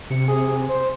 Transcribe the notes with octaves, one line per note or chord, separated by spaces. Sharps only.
C3 C#7
G#4
C5